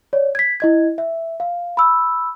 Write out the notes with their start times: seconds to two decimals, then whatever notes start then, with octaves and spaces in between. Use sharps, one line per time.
0.13 C#5 D5
0.35 G#6 B6
0.60 E4 D#5 G#6
0.98 E5
1.40 F5
1.77 B5 E6